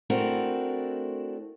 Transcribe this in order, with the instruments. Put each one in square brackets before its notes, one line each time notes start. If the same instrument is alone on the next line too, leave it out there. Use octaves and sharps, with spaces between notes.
[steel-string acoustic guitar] A3 C4 D4 E4 F#4 A#4